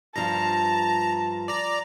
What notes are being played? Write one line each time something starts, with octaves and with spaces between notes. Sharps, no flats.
G2 F3 A5 A#5
D5 A#5